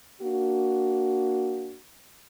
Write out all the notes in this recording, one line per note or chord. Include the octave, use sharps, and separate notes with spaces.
A#3 D4 F#4